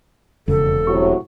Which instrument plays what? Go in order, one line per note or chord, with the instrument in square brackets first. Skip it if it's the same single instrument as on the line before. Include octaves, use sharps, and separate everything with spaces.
[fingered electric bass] E1 [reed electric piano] F2 C#3 [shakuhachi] A4
[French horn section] A2 C3 F#3 [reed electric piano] C#6